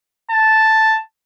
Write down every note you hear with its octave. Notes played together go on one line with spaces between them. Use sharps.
A5